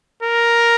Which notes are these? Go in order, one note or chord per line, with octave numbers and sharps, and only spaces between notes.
A#4